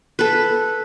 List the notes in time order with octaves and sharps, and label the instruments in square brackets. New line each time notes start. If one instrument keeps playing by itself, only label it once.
[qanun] A4 B4